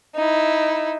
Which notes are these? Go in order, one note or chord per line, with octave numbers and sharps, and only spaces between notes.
D#4 E4